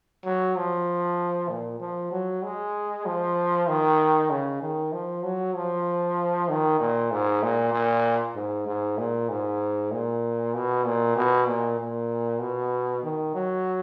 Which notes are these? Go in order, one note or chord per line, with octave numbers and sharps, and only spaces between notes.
F#3
F3
A#2
F3
F#3
G#3
F3
D#3
C#3
D#3
F3
F#3
F3
D#3
A#2
G#2
A#2
A#2
G#2
G#2
A#2
G#2
A#2
B2
A#2
B2
A#2
A#2
B2
D#3
F#3